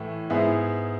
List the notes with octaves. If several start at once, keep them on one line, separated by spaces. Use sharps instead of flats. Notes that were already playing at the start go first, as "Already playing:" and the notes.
Already playing: A2 E3 A3
G#2 G#3 B3 E4 G#4